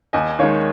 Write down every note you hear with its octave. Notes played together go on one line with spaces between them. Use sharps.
D#2 D#5 G#5
D#3 G#3 D#4 C#5 F5